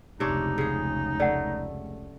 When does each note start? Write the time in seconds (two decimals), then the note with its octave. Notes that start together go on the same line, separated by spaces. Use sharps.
0.20 F1 C#2 C3 D4 D#4 C#5
0.58 C#3 G#4
1.20 A3 D5 F#5